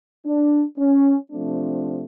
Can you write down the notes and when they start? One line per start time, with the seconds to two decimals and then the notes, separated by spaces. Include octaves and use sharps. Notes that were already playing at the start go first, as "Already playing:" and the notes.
0.26 D4
0.78 C#4
1.31 C3 F3 A3 C4 D4